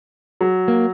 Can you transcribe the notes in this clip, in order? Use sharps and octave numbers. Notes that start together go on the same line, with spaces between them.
F#3
A#3